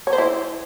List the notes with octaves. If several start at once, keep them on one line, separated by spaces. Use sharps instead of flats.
C#5
C5
E4